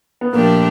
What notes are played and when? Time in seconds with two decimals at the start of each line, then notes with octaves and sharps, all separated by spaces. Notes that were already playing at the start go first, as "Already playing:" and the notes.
0.21 B3
0.33 A#2 F3 A3 A#3 D4 G4